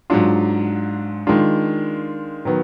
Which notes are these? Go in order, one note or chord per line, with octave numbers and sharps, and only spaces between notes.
G#2 F#3 D4 F4
D#3 G#3 D4 F4
D#3 F#3 B3